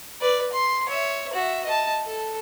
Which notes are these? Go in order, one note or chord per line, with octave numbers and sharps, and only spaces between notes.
B4 D5
C6
C#5 E5
F#4 E5
D#5 A5
A4